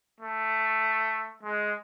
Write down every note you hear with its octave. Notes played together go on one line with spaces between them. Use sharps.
A3
G#3